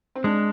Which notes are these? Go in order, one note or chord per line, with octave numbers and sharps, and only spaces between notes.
C4
G#3 D4